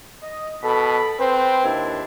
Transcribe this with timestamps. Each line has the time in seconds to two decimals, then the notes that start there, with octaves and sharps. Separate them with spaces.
0.23 D#5
0.63 B2 A4 B5
1.20 C4 B4 C5
1.64 D#2 D4 E4